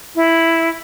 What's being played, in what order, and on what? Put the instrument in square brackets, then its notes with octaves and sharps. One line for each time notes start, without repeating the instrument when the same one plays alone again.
[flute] E4